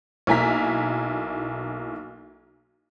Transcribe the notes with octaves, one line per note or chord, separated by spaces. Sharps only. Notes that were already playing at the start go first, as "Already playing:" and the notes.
B1 A#3 E4 G#5 A#5 B6